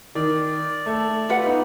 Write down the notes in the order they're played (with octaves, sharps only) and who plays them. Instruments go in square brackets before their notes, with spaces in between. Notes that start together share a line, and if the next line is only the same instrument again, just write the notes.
[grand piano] D#3 [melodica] D5
[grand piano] A3 A4
[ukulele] F4 B4 F#5
[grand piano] B3 D#4